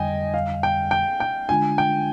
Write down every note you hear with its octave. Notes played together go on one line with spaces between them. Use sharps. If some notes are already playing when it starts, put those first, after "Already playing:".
Already playing: F2 D3 G3 D#5 G5 G#5
F5
G5
G5
G5
D3 G#3 D4 F4 G#5
G5